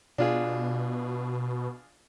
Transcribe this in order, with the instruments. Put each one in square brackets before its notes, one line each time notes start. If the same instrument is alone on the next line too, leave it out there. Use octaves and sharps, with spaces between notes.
[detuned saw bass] B2 [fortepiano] D4 F4 G#4